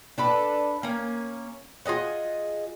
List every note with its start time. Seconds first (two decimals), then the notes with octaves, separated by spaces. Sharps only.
0.18 D4 A4 B4
0.83 A#3 C#4
1.86 F4 G#4 D#5 F#5